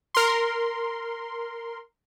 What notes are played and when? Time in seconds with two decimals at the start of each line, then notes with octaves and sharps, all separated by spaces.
0.14 A#4 C6